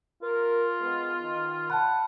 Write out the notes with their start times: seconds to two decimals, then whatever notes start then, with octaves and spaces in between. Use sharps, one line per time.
0.22 F4 A#4
0.80 G#3 B3
1.21 D#3
1.70 F#5 A5 B5